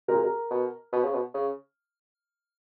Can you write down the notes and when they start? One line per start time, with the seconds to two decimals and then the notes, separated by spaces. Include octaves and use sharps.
0.08 A#2 A#4
0.15 G#4
0.23 A#4
0.51 B2
0.92 B2
1.04 C#3
1.14 B2
1.35 C#3